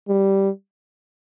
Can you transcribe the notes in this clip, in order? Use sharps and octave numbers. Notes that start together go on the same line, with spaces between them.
G3